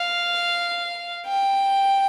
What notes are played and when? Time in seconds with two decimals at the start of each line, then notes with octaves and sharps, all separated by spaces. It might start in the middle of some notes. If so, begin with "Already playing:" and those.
Already playing: F5
1.27 G5